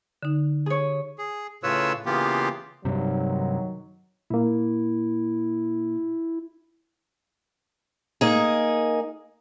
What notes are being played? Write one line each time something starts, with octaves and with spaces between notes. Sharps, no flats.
D3 D#4
G#4 C#5
G#4
A2 C#3 F4 B4 C#5 E6
C#3 E3 A#3 B3 F4 G4
G2 C3 D#3 F#3
A#2 A#3 E4
A#3 D#4 G#4